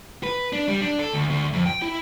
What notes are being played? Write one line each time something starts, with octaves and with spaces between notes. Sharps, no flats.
B4
D4
G3
D4
A4
D2
D2
F2
G5
E4